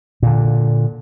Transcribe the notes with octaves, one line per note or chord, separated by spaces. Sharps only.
A#2 D3